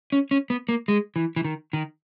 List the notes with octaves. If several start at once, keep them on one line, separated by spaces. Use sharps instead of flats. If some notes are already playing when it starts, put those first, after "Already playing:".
C#4
C#4
B3
A#3
G#3
E3
E3
D#3
D#3